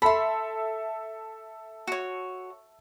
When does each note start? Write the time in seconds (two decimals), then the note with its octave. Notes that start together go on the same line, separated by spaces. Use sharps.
0.02 A4 E5 B5 C6
1.87 F#4 C#5